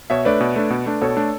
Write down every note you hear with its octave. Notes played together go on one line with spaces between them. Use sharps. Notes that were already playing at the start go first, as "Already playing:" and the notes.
B2 C#5 E5
A3 D4 B4 D5
B2
A3 D4
B2
A3 D4
B2 A4 C#5
A3 D4